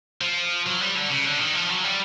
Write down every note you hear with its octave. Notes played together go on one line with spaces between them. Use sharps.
F3
F#3
G3
D3
C#3
D3
D#3
F3
F#3
G3